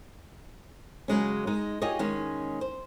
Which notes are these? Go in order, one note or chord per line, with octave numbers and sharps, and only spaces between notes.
C#3 F#3 G#3 C#4
G#3 D#4
D#4 F4 G4 G#4 C#5 D#5
D#3 G#3 C#4
C5